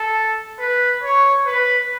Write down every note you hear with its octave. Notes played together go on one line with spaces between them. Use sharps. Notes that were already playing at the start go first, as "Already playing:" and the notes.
Already playing: A4
B4
C#5
B4